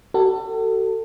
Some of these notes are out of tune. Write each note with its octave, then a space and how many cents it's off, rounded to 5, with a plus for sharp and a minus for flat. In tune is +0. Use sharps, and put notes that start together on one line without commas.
F#4 +45 A4 +30